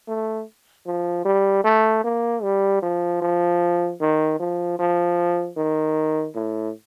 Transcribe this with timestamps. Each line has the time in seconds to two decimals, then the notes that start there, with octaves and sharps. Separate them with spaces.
0.08 A3
0.87 F3
1.25 G3
1.64 A3
2.04 A#3
2.43 G3
2.82 F3
3.22 F3
4.01 D#3
4.40 F3
4.79 F3
5.57 D#3
6.35 A2